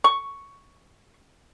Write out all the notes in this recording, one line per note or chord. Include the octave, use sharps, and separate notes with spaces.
C#6